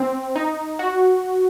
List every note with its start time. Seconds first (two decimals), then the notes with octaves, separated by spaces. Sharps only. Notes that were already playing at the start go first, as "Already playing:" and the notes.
Already playing: C4
0.36 D#4
0.79 F#4